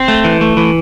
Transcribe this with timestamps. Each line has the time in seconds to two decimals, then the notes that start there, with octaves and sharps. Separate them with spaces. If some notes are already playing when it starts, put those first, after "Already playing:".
Already playing: C4 C5
0.08 A3
0.24 E3
0.41 A3
0.57 E3